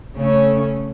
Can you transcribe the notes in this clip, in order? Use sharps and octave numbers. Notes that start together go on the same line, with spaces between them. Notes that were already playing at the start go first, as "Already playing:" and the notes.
C#3 A3 C#4